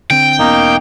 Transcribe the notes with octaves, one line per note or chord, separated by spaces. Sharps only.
D3 C4 G5
E1 A#3 B3 C#4 D#4